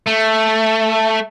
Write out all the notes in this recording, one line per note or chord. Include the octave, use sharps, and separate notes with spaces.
A3